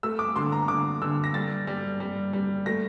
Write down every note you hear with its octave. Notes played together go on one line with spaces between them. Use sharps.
A3 E6
D6
D3 C6
A#5
D3 D6
D3 E6
A#6
G3 A6
G3
G3
G3
A3 A#6